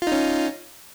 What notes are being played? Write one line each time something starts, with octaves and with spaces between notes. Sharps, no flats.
C#4 D#4 F4